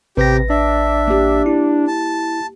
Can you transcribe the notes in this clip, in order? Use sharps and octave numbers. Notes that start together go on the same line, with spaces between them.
A1 C3 G4 B4 A#6
D4 E5
A#3 G4
E4
A5